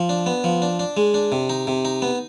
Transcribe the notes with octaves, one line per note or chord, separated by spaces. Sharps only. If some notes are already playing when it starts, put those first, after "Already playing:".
Already playing: F3
D4
B3
F3
D4
D4
G#3
D4
C3
D#4
C3
D#4
B3